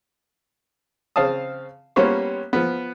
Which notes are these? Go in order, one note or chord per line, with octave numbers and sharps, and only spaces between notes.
C#3 C4 F5 A5 D#6
G3 A#3 B3 C#4 C5 C#5
F3 B3